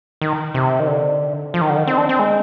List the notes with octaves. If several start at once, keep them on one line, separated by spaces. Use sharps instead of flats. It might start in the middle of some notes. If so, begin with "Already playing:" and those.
D#3
C3
D#3
D3
F3
D#3
D3
D#3
C4
D4
C4
G#3